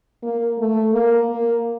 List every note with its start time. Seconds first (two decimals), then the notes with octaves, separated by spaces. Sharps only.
0.22 A#3
0.59 A3
0.93 A#3
1.29 A#3